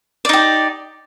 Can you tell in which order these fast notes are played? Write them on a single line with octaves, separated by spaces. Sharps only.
D5 D#4 G4